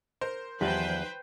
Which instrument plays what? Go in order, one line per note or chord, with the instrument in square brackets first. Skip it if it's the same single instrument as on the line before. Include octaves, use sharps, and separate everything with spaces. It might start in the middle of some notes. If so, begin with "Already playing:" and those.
[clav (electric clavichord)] A#4 [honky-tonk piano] C5
[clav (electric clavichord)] E2 [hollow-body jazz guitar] D#3 F3 D#4 [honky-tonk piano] G3 [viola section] B4 C5 G5